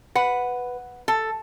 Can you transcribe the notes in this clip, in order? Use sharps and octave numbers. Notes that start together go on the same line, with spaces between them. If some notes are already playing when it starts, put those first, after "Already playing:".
B4 F#5
A4